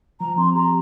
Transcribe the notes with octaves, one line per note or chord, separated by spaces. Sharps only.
F3 A#5
C4 C6
G4 A#5